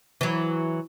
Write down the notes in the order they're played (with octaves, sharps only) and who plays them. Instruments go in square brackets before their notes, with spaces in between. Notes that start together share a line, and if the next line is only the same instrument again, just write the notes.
[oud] E3 F#3